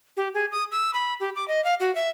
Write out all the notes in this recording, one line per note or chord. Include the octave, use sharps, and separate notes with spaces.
G4
G#4
D#6
E6
B5
G4
D6
D#5
F5
F#4
E5